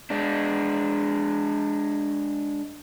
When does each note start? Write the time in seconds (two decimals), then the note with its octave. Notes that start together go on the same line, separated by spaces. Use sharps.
0.10 G#3 D4